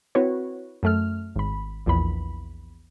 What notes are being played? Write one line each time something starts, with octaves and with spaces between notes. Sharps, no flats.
C4 E4 F#4 B4 C#5
F#2 A3 F6
G#1 B5
A#1 E2 B5